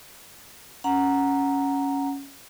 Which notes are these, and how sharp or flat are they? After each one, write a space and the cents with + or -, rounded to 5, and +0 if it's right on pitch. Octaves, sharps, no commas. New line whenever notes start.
C#4 +0 F#5 +0 A#5 +0